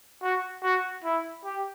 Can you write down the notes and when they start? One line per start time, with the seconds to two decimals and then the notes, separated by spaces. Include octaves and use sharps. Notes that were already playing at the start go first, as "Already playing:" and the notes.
0.23 F#4
0.63 F#4
1.04 E4
1.45 G4